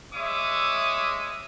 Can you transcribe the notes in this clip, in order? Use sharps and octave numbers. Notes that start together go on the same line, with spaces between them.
G#3 C#5 E5 D6 D#6